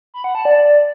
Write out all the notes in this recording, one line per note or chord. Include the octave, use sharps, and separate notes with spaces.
B5
F#5
A5
D5